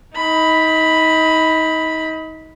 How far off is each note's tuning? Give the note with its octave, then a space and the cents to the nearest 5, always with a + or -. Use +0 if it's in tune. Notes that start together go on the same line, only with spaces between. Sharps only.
D#4 +30 B5 +0